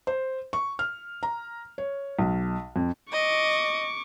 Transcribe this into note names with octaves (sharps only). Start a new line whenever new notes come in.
C5
C#6
F6
A#5
C#5
B1
F2
D#5 C#6 D6